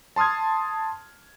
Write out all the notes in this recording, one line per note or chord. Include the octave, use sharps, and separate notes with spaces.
A5 C6 D#6 F6 G#6